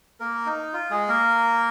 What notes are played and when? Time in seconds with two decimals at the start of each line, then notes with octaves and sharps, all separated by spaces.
0.20 A#3 A#4
0.46 D#4
0.73 F4
0.90 G#3 G#4
1.08 A#3 A#4